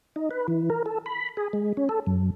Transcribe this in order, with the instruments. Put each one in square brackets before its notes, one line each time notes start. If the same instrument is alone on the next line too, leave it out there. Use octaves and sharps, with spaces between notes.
[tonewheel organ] D#4
B4
E3
A#4
A4
B5
G#4
G#3
C#4
A4
F#2